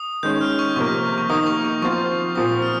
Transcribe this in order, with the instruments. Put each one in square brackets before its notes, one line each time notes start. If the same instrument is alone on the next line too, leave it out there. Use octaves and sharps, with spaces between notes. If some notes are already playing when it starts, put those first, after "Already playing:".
Already playing: [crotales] D#6
[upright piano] D#3 G#3 C#4 [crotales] G6
[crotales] F6
C#6
[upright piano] C3 F3 A#3 [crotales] C#6
[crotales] C#6
[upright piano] D#3 A#3 D#4 [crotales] D#6
[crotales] C#6
C#6
[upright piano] F3 C4 F4 [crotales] C#6
[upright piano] A#2 F3 C4 [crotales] D#6
[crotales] F6